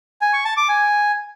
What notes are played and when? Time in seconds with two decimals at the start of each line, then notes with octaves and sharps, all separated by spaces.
0.21 G#5
0.33 C#6
0.45 A5
0.57 D6
0.69 G#5